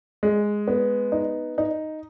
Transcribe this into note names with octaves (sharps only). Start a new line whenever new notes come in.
G#3
B3
D#4
D#4